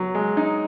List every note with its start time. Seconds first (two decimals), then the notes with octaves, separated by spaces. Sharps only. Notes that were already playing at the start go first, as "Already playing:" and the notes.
Already playing: F#3
0.15 G#3
0.37 D#4